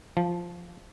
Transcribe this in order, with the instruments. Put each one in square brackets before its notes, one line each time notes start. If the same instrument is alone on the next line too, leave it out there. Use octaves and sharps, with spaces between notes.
[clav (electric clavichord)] F3